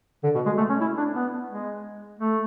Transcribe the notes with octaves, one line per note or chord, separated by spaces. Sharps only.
D3
B2
G#3
A3
C#4
E4
D4
B3
G#3
A3